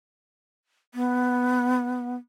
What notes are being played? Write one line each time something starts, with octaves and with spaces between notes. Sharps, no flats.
B3